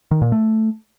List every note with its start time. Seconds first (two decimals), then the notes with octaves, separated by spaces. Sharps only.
0.11 D#3
0.22 A#2
0.32 A3